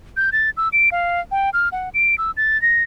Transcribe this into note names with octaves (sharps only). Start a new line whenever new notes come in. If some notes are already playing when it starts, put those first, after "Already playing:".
G6
A6
E6
D7
F5
G5
F6
F#5
D7
E6
A6
A#6